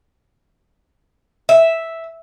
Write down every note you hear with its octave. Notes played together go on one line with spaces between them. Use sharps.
E5